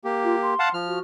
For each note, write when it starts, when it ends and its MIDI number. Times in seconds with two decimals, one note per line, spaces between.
0.04 0.54 58
0.04 0.54 67
0.23 0.35 65
0.42 0.71 84
0.59 0.69 77
0.59 0.69 78
0.59 0.69 81
0.74 0.99 53
0.74 0.99 89
0.86 1.01 66